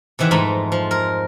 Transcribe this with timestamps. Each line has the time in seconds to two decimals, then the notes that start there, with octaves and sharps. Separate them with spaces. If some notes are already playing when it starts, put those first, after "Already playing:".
0.19 C3 D#3 E3 E5 F#5
0.31 F2 G#2 A3 D#4 B5
0.72 F3
0.91 A#4